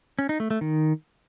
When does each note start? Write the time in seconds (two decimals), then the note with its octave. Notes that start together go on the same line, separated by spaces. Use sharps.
0.19 C#4
0.29 D#4
0.40 A3
0.51 A3
0.61 D#3